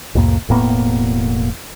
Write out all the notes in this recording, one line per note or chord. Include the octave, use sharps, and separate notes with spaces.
C2 F2 A2 A#3
E1 A2 A#3 B3